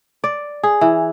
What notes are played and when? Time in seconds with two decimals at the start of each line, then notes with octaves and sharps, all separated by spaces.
0.24 D5
0.63 G#4
0.81 E3